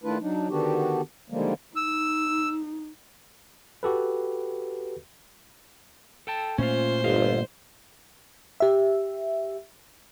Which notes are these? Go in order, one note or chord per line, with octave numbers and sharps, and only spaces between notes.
D#3 A3 D4 E4 F4 B4
F#3 D4 D#4
D3 D#3 B3 D4 F#4 G4
D3 D#3 F3 G3 G#3 A#3
D#4 E6
F#4 G4 A4 B4
A4 G5 A5
A#2 A3 C#4 F4 C5
G1 F4 D#5 F5
G4 E5